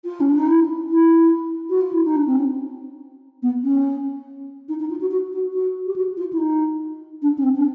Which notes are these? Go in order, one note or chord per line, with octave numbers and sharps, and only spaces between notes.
F4
C#4
D4
D#4
E4
E4
F#4
F4
E4
D#4
D4
C4
C#4
B3
C#4
D#4
D#4
F4
F#4
F#4
F#4
F#4
G4
F#4
F4
E4
D#4
D4
C#4
C4
D4